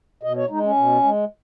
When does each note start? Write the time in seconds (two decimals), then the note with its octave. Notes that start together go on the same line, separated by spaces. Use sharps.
0.23 B2 D#5
0.36 C#5
0.50 G#3 D#4
0.63 C#4
0.77 B2
1.03 G#3